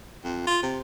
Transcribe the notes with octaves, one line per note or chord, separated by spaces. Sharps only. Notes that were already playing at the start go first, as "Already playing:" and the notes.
F2
F4
C3